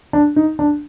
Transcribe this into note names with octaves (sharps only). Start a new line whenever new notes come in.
D4
D#4
D4